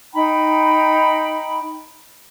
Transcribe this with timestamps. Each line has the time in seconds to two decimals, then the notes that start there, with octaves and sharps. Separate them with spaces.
0.13 D#4 G5 A#5 B5